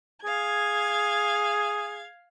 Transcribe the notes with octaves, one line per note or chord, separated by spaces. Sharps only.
G#4 F5 G#6